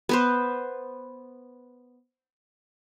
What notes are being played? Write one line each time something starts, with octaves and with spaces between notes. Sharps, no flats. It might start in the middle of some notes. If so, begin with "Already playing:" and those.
B3 B4 C5